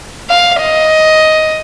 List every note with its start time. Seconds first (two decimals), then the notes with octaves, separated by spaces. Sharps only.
0.30 F5
0.62 D#5